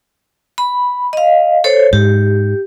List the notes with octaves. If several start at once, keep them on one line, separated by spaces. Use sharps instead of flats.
B5
D#5 F5
A4 C5 C#5
G#2 G4